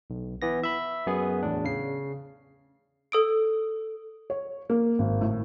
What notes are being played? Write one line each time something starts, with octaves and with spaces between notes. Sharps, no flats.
B1
E3 B3 A#6
E5 B5
F#2 B3 G#4
E2 A2 D4
C#3 C7
A4 D#6 D7
C#5
A#3
G#1
A2